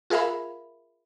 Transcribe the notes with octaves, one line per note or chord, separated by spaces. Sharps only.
F4 G#4 A#4 E5 F5 B5